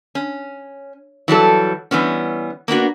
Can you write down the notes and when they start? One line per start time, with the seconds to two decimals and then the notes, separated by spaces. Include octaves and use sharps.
0.15 C#4
1.28 E3 F#3 G3 A4
1.91 E3 G3 B3 C#4
2.68 A#3 B3 D4 F#4